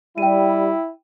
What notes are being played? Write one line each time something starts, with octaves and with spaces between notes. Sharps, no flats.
G3 E4 G5 D#7